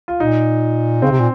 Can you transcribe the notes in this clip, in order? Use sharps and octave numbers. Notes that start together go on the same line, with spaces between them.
F4
A#2 D#4
C#3 C4
C3
A#2